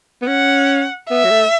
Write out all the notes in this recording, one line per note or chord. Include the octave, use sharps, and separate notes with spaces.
B3
C#4 F#5
B3 E5
F#3
A3